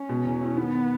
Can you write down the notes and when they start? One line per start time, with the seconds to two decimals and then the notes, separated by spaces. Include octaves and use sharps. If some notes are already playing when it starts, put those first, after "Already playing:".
Already playing: C#4
0.09 B2
0.25 E2
0.41 E4
0.57 D#3 B3